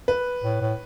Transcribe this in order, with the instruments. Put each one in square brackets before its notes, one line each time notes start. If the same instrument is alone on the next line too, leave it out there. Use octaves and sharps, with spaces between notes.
[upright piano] B4
[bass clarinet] A2
A2